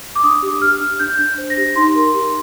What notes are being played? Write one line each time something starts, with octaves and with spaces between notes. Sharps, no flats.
D6
D4 D#6
G4
G4 F6
D4
D4 G6
D4
C5
A#6
G4
D#4 C6
A#4
G4